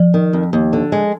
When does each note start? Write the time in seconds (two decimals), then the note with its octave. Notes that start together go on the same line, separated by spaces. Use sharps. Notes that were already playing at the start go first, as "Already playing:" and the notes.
Already playing: F3
0.14 D#3
0.33 F2
0.53 D#2
0.73 D3
0.92 G#3